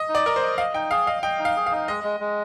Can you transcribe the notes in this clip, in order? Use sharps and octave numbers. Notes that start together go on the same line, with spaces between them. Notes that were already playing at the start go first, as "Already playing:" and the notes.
Already playing: D#5
D#4
D5
A#4 D#5
C5
D#5
D#5 F5
D#4 G5
G#4 F5
D#5 F5
D#5 G5
D#4
F5
G#4
F5
D#4
G#3 D#5
G#3
G#3